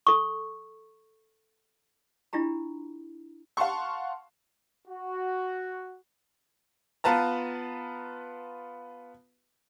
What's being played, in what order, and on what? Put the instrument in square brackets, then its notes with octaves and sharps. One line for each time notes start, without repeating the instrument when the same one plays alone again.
[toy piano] A4 C#6
D4 E4 F4 G4 A#5
[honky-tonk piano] F5 F#5 A5 C6 C#6
[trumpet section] F#4
[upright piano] B3 F4 B4 A5 A#5